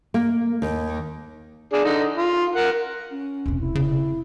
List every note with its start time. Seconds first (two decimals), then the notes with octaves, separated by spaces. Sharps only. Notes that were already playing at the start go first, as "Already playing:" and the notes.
0.14 A#3
0.62 D#2
1.73 D4 G#4
1.84 D3 D#4
2.17 F4
2.55 A#4 F#5
3.11 C#4
3.46 E1 C3
3.60 E4
3.75 C#3